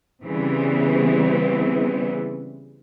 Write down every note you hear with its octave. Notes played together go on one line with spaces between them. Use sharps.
C#3 E3 G3 B3 C4